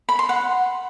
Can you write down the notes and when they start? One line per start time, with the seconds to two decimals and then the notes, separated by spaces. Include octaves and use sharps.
0.09 B5
0.19 C6
0.29 F#5